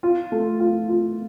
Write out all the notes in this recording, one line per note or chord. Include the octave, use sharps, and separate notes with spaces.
F4
A3
F4
F4